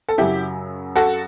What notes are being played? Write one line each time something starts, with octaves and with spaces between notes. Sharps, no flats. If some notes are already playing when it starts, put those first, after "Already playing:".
A4
F#2 C#3 F#3 E4 G4
F#4 A4